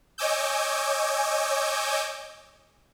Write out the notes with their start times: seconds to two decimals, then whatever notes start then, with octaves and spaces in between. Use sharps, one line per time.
0.18 C#5 D#5 G#5 D6 E6 G6